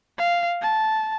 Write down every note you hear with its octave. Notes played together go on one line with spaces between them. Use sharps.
F5
A5